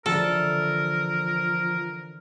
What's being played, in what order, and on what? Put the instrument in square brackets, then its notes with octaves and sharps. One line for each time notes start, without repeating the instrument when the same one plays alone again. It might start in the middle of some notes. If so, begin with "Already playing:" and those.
[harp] D3 E3 [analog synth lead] F3 [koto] A4 [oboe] A#4